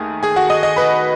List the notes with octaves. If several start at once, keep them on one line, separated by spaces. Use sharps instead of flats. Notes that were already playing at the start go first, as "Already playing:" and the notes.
Already playing: D#2 D#3 A3 G#4 G#5
G#4 G#5
F#4 F#5
D#5 D#6
D#5 D#6
B4 B5